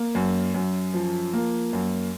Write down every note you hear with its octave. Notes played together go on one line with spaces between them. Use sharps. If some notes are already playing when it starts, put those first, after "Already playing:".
Already playing: A#3
F#2
F#2
F3
A#3
F#2